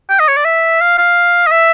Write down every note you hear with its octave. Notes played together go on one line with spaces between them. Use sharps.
G5
D#5
C#5
D5
E5
F5
F5
D#5
E5